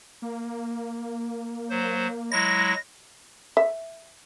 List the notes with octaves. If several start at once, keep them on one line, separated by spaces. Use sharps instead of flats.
A#3
F#3 C5
F#3 G#3 E4 A#6
E5